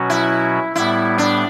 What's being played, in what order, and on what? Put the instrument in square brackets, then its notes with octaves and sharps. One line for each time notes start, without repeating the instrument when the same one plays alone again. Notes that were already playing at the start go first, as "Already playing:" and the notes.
Already playing: [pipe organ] B2 F#3 C#4 F#4
[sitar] E4
[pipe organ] A2 G3 B3 [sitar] E4
[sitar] D4